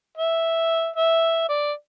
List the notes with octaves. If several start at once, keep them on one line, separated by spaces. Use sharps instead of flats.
E5
E5
D5